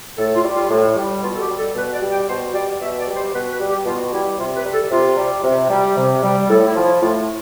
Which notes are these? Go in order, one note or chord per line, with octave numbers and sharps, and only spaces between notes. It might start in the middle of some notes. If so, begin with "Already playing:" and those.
A2 A4
F4
G3
F4
A2
G3
B2 F4
A4
G4
G3
A4
B2 B4
D5
G3
G5
B2 C5
G3 D5
B2 E5
D5
G3
C5
B2 B4
B4
G3
G4
B2 F4
G3 E4
C3 F4
B4
G3
A4
C3 F4
G3
C3
G3
C3
G3
A2 A4
E4
F3
E4
A2 F4